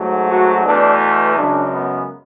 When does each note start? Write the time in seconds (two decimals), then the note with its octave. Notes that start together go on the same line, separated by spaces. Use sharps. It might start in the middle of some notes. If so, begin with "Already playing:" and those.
Already playing: G#2 F#3 A3
0.27 F#4
0.63 E2 B2 A3 D4
1.35 F#2 C#3 G#3 D4
1.73 B3